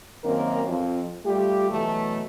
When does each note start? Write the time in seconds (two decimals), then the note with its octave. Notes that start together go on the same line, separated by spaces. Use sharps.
0.24 F#2 D#3 A#3 C4 C#4 A#4
0.67 F2
1.25 G3 A3 F4 G4
1.71 B2 E3 F#3 A3